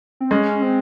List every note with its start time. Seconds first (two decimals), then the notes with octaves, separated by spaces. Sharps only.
0.20 C4
0.31 G#3 C#4
0.62 C4